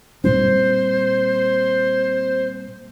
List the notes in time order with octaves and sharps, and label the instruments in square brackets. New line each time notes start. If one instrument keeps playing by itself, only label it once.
[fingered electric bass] A#2 G3 C4 [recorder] C5